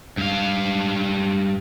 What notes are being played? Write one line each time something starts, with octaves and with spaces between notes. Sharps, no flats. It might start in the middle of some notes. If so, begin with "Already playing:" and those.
G2 F5